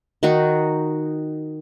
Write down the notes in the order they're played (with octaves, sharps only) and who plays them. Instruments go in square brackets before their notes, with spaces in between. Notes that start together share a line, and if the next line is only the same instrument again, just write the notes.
[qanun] D#3 D#4 F#4